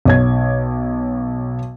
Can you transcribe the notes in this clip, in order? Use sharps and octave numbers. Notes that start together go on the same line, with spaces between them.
B1 C#5 G#6